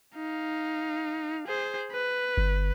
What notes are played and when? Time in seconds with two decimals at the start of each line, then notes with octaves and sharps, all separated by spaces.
0.15 D#4 F5
1.47 G#4 C5
1.92 B4
2.37 G1